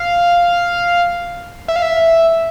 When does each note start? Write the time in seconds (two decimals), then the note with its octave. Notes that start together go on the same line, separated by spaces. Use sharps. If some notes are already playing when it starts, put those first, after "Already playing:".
Already playing: F5
1.68 E5
1.76 F5
1.82 E5